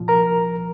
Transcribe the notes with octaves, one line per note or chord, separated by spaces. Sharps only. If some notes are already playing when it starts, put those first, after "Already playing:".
Already playing: C2 A#2 F3
A#4 A#5